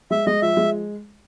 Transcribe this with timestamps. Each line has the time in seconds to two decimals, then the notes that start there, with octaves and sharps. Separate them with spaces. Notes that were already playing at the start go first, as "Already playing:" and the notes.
0.11 G#3 E5
0.26 G#3 D#5
0.42 F3 E5
0.57 G#3